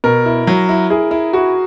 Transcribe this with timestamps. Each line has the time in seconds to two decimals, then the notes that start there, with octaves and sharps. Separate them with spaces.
0.04 B2 A#4
0.26 E4
0.47 F#3
0.69 E4
0.90 E4 G#4
1.11 E4
1.33 E4 F#4